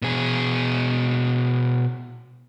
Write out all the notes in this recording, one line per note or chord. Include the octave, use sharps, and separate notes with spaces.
B2 G#4